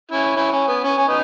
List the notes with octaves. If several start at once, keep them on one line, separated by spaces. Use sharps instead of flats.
C#4 E4
C#4 E4
C#4
B3
C#4
C#4
B3 D#4